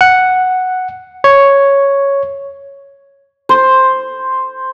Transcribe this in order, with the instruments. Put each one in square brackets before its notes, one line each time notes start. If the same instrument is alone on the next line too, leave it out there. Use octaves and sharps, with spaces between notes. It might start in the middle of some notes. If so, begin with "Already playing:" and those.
[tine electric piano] F#5
C#5
[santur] C5